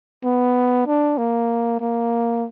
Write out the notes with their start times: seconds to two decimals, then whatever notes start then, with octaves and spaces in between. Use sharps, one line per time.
0.24 B3
0.86 D4
1.17 A#3
1.80 A#3